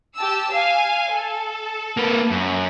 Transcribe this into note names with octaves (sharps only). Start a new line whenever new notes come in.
G4 A5 E6
F5 G#5
A4
A#3 B4
F#2